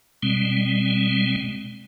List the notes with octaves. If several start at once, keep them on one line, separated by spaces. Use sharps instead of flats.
B2 G3 G#3 C4